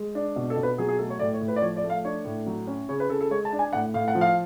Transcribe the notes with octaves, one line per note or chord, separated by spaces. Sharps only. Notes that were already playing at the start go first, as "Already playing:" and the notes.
Already playing: G#3
D4
B2
A4
B2
B4
F#3 G#4
G#4
A3 A4
C#5
A2 D5
C#5
A2
B4
D5
F3 C#5
D5
A3
F5
D4 C#5
A2
F#3
C#4
C#3 C#5
B4
C#3 A4
A4
G#3 C#5
A5
D4
G#5
A2 F#5
A2 F5
F#5
F3
F5